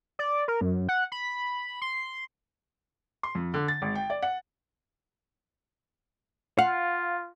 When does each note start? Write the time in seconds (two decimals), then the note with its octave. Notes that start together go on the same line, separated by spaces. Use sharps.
0.19 D5
0.48 A#4
0.61 F#2
0.89 F#5
1.12 B5
1.82 C6
3.23 C6
3.35 F2
3.54 D3
3.68 A6
3.82 G#1
3.95 G5
4.10 D5
4.22 F#5
6.58 F4 F5 F#5